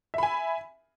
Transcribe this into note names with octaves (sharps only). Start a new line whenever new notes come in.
E5 G#5 B5